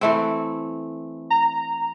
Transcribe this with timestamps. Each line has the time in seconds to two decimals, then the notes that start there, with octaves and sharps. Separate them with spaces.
0.01 E3 A3 C4
1.30 A#5